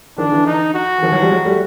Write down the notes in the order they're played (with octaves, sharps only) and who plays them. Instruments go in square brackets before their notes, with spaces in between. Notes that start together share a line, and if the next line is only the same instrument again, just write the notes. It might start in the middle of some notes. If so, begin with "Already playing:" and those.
[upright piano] D#3 F3 [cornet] D4
[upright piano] D3 E3
[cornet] D#4
F#4
[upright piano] E3
D#3 F3
E3 F#3
F3 G3
F#3 G#3
G3 A3